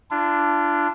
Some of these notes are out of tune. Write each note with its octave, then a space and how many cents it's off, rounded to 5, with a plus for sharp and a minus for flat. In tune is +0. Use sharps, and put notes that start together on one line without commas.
D4 +0 F4 -40